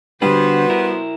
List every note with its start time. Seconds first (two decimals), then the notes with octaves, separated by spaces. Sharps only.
0.22 D3 G3 B3 D4 F#4 C5
0.70 E4 A#4